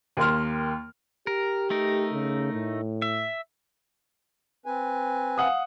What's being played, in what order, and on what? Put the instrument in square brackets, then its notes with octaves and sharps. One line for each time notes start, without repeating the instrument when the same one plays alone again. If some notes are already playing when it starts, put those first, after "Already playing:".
[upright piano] D#2 A#3 C6 F6
[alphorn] G4 [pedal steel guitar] A#4
[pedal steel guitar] A3 D#4 A#4
[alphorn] C#3
A2
[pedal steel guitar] E5
[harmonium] C4 B4 G#5
[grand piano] F5 F#5 D#6